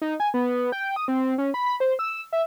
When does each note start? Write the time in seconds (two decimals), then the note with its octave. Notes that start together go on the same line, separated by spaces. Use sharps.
0.02 D#4
0.20 G#5
0.34 B3
0.72 G5
0.96 D#6
1.08 C4
1.38 C#4
1.54 B5
1.66 B5
1.80 C5
1.99 E6
2.33 E5